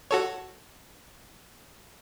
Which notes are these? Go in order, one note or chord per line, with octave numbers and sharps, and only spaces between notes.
F#4 A4 C#5